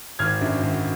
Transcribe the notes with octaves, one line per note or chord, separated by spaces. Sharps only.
G#1 F6 G#6
F#2 D3
G#1